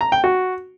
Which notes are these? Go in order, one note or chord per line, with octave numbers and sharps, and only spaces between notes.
A#5
G5
F#4